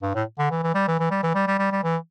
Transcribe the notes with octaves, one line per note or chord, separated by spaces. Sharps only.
G2
A2
D3
E3
E3
G3
E3
E3
G3
E3
G3
G3
G3
G3
E3